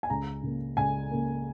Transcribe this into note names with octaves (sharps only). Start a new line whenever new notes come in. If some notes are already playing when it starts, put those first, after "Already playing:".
G#5
C#2 A#5
C#3 A#3
C#2 G#5
C#3 A#3